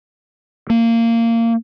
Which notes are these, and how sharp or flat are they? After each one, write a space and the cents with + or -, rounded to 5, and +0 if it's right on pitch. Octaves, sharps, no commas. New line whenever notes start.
A#3 -20